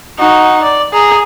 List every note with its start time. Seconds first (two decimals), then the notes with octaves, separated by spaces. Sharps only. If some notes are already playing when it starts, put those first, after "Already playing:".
0.18 D#4 F#4
0.62 D5
0.93 G#4 A#5